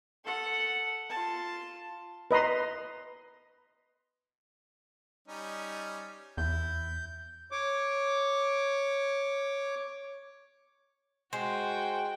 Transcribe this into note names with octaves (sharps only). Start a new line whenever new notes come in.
A4 F#5
F4 A5
B4 D#5 A#5 C6
G3 C#4 D#4
E2 E4 G6
C#5 D6
G#3 F#4 C5 G5